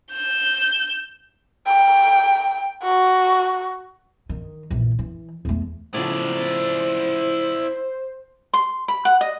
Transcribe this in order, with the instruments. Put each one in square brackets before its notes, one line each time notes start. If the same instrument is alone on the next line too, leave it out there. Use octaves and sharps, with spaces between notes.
[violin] G6 E7
[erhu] G5
F#4
[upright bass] D#3
A#1 E3
E3
E2 A3
[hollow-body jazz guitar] A2 C#3 F3 [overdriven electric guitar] E4 D5 [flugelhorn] C5
[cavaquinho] C6
B5
F#5
D#5